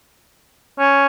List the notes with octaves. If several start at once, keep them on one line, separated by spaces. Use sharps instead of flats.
C#4